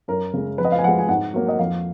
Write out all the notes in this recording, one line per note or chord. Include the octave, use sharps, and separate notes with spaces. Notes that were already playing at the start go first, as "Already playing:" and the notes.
F#2 A#4
C#3 G#3
F2 B4
D#5
F5
G#5
F3 G#3 F#5
G#5
G#2 F#5
F#3 A#3
D#5
F2 F5